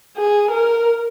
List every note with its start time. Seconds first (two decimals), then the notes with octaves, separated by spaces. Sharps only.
0.17 G#4
0.52 A#4